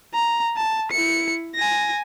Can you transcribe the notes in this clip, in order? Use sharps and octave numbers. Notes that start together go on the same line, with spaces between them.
A#5
A5
E4 C#7
G#5 A#6